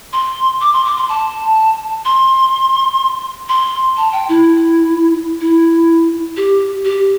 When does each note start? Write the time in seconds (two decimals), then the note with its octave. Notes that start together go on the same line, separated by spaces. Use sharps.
0.13 C6
0.61 D6
0.73 C6
0.85 D6
0.97 C6
1.09 A5
2.05 C6
3.49 C6
3.97 A5
4.12 G5
4.29 E4
5.40 E4
6.37 G4
6.85 G4